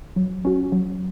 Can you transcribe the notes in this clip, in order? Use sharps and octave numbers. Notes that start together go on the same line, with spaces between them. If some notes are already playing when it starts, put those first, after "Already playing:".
F#3
C#4 F#4
F#3